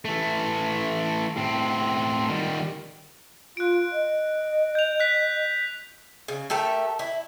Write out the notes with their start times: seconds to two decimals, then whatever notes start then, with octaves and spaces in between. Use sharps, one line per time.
0.05 E3 A3
1.37 A2 C4
2.29 D#3 G3
3.57 F4 F#6 D7
3.92 D#5
4.75 G6 F7
5.00 F#6 B6
6.28 C#3
6.50 A3 G4 A4 A#4
6.99 E4